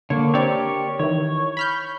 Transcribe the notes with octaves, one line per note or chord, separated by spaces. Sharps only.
D3 A#3 C#5
C4 G4 A#4 C#5 D5
D#3 E3 C#5
B5 F6 G6